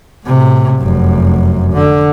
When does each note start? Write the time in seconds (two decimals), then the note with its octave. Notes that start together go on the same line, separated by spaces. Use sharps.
0.25 A2 C3
0.78 F1 F#2
1.73 D3